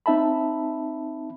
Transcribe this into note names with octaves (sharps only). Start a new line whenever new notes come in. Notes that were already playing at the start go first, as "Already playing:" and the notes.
C4 D#4 E5 A5 B5